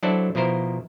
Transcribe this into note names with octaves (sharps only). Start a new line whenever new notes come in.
F#3 D4 E4 A4 C5 D5
B2 F3 E4 A#4 C5